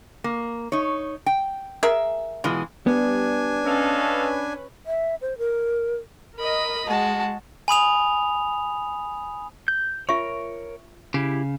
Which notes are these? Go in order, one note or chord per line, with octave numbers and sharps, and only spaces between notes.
A#3
D#4 C#5
G5
G#4 A#4 E5
B2 E3 G#3 F4
G3 B3 D4 G#5
C#4 A4 B4 D#5 F5
E5
C5
A#4
A#4 D#5 B5
G#3 F#4 A5
G#5 B5 D#6 F7
G6
F4 A#4 C#5 E5 C#6
C#3 E4 G4